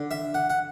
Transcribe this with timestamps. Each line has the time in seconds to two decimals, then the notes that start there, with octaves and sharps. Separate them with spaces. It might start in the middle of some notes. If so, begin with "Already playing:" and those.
Already playing: D3
0.11 E5
0.34 F#5
0.50 F#5